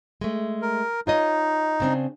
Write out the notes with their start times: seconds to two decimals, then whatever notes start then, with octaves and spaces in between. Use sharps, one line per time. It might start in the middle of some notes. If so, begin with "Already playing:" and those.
0.21 G#3 A3
0.62 A#4
1.07 D#4 F4 C#5 D#5
1.80 C#3 C4 D4